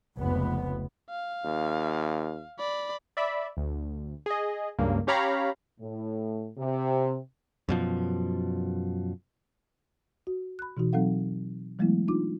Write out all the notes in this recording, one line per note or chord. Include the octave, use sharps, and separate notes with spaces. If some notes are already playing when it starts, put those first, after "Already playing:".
F1 C#2 B3
F5
D#2
D5 B5
D5 E5 B5
D2
G#4 D#5
C#2 G2 C#3 A#3
C#4 G4 C#5 F5 A#5 B5
A2
C3
F#2 B2 F3
F#4
B5 F#6
B2 E3 D#4 F#4
F#3 C4 D#4 A4 F5 F#5
E3 F#3 G#3 A3 B3 E4
D4 D#4 F4 D6